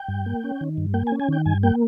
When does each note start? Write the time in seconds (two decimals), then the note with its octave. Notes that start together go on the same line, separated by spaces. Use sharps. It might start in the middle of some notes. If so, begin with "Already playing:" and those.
Already playing: G5
0.08 G2
0.26 A#3
0.44 C#4
0.61 D#3
0.78 G2
0.94 A#3 G5
1.07 G#5
1.12 C#4
1.20 G#5
1.29 D#3 G5
1.46 G2 G#5
1.63 A#3 G5